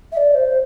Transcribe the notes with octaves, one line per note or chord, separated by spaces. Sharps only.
E5
D5
C5